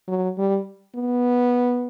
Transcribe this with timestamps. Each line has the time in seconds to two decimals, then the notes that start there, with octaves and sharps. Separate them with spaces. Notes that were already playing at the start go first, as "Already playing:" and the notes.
0.08 F#3
0.38 G3
0.96 B3